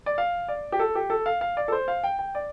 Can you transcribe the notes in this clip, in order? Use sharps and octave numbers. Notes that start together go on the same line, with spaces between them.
D5
F5
D5
G4
A4
G4
A4
F5
F5
D5
A4
C5
F5
G5
G5
D5